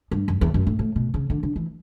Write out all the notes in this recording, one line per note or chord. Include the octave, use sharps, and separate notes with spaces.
G2
F#2
E2
F#2
A2
A2
B2
C#3
D3
D3
E3